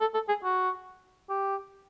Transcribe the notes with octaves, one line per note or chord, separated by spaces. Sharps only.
A4
A4
G#4
F#4
G4